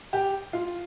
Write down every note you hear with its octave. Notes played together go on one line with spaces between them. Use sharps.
G4
F4